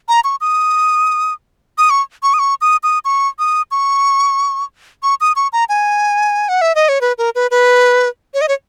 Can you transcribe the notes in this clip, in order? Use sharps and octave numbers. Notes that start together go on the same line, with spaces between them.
A#5
C#6
D#6
D#6
C#6
C#6
D#6
C#6
D#6
D#6
C#6
D#6
C#6
C#6
D#6
C#6
A#5
G#5
F#5
E5
D#5
C#5
B4
A#4
B4
B4
C#5
D#5
C#5